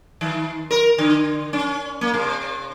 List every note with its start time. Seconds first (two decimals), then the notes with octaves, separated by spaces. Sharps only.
0.21 D#3
0.71 A#4
0.98 D3
1.53 C#4
2.01 A#3
2.14 C3